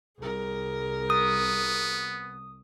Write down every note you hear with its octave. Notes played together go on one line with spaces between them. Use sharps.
C2 G#4 A#4
B3 D#6